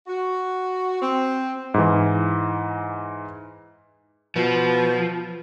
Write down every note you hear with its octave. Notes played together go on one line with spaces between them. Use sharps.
F#4
C4
G#2 E3
B2 F3